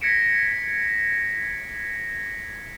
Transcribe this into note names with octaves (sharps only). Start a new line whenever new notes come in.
G#6 A#6 B6 C#7 D7 E7